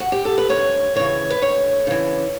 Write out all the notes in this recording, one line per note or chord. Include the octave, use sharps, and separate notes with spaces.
F#4
G4
A4
B4
D2 C#5
C#3 E3 C#5
B4
D2 C#5
C#3 E3